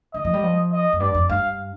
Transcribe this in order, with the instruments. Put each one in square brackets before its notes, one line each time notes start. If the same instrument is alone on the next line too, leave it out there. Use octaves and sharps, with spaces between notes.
[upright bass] D3 [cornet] D#5
[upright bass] F3
G3
F3
[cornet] D#5
[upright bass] F2
[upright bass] G2 [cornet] D5
[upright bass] F2
[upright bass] G2 [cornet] F5